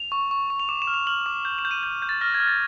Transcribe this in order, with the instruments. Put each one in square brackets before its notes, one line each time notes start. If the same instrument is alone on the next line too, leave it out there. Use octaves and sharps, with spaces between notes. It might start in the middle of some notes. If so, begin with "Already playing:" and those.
Already playing: [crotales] F7
C#6
C#6
C#6
F7
D6 E7
E7
F6
F7
F6 F#7
D6
G6
E7
G6
D#7
G6
G6
A6
F6 A#6
G#6
F6
A6